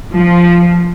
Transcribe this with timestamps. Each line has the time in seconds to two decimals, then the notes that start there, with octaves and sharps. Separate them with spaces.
0.14 F3